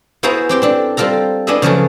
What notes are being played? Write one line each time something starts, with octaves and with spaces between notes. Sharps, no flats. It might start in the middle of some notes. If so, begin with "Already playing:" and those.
B3 E4 F#4 G#4 C5 A#5
C4 G4 G5 C6
C4 D4 A4
G3 C4 F4 A4 A#5
B3 D4 E4 G#4 D#5 E5
C#3 F3 F#3 A3 G#4